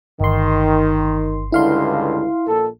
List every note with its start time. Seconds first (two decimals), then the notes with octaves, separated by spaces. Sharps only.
0.20 G1 D#3 C6
1.52 C#2 G2 D3 E4 F5 C6
2.46 A#1 A4